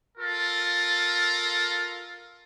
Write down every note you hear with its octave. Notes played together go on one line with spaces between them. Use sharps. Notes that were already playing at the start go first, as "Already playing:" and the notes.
F4 A4 A#4